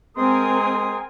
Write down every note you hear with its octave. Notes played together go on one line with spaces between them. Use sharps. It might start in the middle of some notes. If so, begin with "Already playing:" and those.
G#3 C4 A#4 G#5 C6 D#6